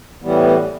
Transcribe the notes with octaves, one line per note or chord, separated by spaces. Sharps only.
A2 E3 G3 B3